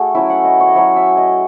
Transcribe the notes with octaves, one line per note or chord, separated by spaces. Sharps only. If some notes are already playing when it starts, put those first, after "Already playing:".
Already playing: A3 F#4 G#4
F#3 C#4 E4 E5
F#5
D#5
C#5
D#5
F#3 C#4 E4 C#5
E5
D#5